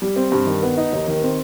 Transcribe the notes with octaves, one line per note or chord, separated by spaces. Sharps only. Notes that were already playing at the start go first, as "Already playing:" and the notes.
G3
C4
G2
D#3
B3
D#4
D#2
D#3
C4